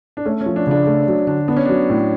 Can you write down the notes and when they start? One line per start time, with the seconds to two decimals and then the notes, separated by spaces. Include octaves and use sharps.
0.17 D4
0.25 A3 C#4
0.41 C#4
0.46 F3
0.56 D4
0.67 C#3 D4
0.87 A3
1.08 F#3
1.27 D3 D4
1.48 B3 D4
1.57 C#4
1.66 F#3 D4
1.90 A2